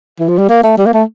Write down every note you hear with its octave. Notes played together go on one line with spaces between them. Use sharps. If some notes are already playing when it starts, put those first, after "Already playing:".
E3
F3
G3
A#3
A3
G3
A#3
A3